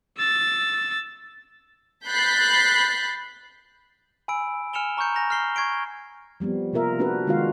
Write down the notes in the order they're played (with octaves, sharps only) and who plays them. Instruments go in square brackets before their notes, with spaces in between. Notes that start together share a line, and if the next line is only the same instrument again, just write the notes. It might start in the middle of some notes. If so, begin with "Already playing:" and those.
[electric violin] E6 A6
[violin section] B5 F#6 G6 A6 B6 C7
[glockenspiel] G#5 B5 E6 D7
G#5 F6 C#7 E7 F7 G7
A#5 C#6 F6 G6 C#7
G#5 G6 A#6 F7
F6 A#6 C7 G7
C#6 G#6 C7 D7 G7
[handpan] F3 G3 B3 C4
C3 A#3 F4 A#4 E5
A#3 C4 D4 F#4 A#4 B4
D#3 G#3 D4 F4 F#4 F5